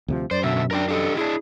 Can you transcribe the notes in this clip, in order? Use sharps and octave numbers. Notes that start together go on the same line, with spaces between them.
D2 C3 F3
F#2 C5 D5
B2 D3 E5
D4 A#4 D5 G5
D4 G4 A4 D#5
D4 E4 G#4